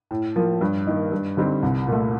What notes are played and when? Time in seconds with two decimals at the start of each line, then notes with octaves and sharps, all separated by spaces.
0.11 A2
0.36 F3 A#3
0.61 G2
0.87 D#3 A#3 D#4
1.12 G2
1.37 D3 G3 C4 D#4
1.63 C2
1.88 A#2 A3